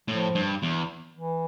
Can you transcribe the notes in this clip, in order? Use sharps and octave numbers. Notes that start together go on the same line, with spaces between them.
A2 F3
G2
E2
E3